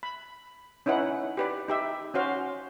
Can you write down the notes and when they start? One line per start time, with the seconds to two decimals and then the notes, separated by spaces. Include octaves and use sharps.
0.03 B5
0.86 C#4 D#4 E4 B4 F#5
1.37 G4 B4 D5
1.68 D#4 G4 E5
2.14 C#4 F#4 C5 F5